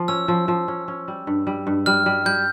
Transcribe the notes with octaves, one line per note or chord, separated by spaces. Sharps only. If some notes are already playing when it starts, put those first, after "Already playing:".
Already playing: F3
C#4 E6
F3
F3
C#4
C#4
G3
G2
G3
G2
G3 F6
G3
G3 G6